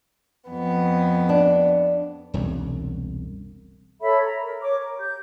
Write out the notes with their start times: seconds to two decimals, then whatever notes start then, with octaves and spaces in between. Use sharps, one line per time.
0.50 F2 B3
1.29 D4
2.34 E1 C2 F#2
4.02 A4 C#5 E5 B5
4.25 A#5
4.41 A#4
4.62 C#5 D6
4.79 A#4
4.99 G4 G6